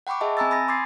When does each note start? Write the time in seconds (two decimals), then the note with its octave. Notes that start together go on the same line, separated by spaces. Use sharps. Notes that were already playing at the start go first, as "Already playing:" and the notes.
0.07 F#5 G5 B5 C#6 D6
0.21 G#4 D#5 E5 A5
0.37 C4 G#5 A#5 B5 E6 A6
0.51 G#5 B5 D#6 A6 A#6
0.68 C6 D6 D#6 G#6 A6 C7